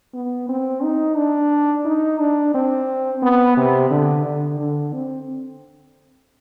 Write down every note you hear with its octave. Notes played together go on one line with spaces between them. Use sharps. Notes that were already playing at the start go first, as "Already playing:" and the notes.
B3
C4
D#4
D4
D#4
D4
C4
B3
C3
D3
D3
D3
C4